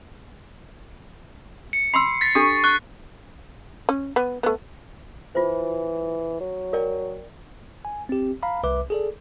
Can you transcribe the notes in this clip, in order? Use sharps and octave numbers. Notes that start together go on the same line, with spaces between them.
C#7
B5 C6 E6 C7
A6 B6
D4 G4 A4 C#6
C#6 F#6
C#4
B3
A3 B3
E3 F4 C5
F#3
A#4 D5 G5
G#5
C4 G4
F5 A#5 B5
C2 B4 E5 D6
G#4 A4 D5